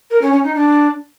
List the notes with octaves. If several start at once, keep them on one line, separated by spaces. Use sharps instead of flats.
A#4
C#4
C#4
D#4
D4